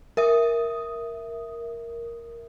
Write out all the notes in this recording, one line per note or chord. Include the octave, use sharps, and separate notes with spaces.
A#4 E5 D#6